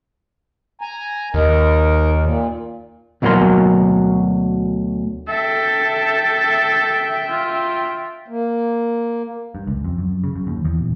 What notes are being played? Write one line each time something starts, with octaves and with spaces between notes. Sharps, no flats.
G#5 A#5
D#2 D#4 A#4
A#2
D2 B2 F#3 A#3 A#4 C6
A4 E5 G5
F4
A#3
G2
C#2
F2
F#2
C#3
F#2
D#2
E2
D#1